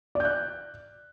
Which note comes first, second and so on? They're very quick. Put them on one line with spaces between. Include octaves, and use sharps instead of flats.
D5 G6 F#6